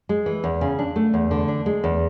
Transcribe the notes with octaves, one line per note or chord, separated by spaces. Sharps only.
G#3
E3
E2
C#3
D4
A3
E2
D3
D4
G#3
E2